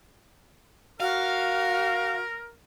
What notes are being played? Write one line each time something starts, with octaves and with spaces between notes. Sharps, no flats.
F#4 A#4 F5